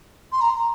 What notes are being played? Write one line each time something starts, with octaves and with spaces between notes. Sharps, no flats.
C6
A#5